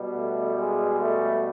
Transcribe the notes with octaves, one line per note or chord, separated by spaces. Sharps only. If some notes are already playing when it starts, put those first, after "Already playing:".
Already playing: B2 G3
A3
G#3
A3